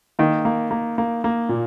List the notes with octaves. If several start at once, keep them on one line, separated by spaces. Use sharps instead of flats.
D#3 A#3
A#3
A#3
A#3
A#3
A#2